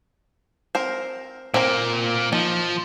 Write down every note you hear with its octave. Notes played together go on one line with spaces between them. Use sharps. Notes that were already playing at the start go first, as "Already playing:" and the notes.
C4 A#4 C5
A#2 A#3 C4 A#4
F3 D#4